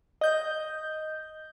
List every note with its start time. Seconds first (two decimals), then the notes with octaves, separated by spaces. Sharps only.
0.21 D#5 G6